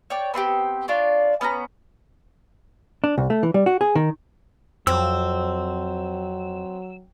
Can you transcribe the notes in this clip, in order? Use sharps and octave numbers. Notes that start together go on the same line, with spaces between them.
C#5 D5 G5 D6
B3 C4 F#4 G4
D4 F4 C#5 D5
B3 C#4 G#5 A#5
D4
C2
A3
E3
G3
F#4
G#4
D#3
F2 F#3 C4 E6